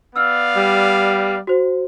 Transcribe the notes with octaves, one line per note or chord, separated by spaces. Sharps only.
B3 D5 F5 E6 F6
G3
F#4 C5